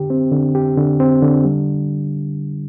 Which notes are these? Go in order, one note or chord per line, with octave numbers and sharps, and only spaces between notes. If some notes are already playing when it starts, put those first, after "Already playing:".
Already playing: D3 G4
C4
D3
G4
D3
C4
D3
G3